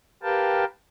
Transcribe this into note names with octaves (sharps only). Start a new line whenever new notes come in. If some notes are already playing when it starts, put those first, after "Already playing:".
G4 A#4 B4 F5 G5 A5